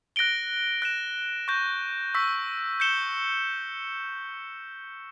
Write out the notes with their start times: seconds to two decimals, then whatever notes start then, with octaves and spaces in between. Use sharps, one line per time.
0.16 F#6 A#6 D7 G7
0.82 F#6 A#6 E7
1.48 C#6 G6 A#6
2.14 C#6 E6 B6
2.80 G6 C#7 E7 G7